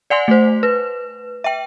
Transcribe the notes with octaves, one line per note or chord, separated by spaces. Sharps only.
D5 F#5 G#5 C6
A3 C5
B4
E5 G5